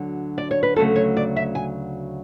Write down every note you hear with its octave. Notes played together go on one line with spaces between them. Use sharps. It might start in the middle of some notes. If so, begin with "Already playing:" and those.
Already playing: D2 D3 F#3
D5
C#5
B4
D2 C#3 F#3 A3 A4
C#5
D5
E5
G#5